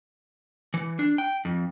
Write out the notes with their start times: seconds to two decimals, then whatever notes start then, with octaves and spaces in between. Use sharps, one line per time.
0.74 E3
0.99 D4
1.18 G5
1.45 F2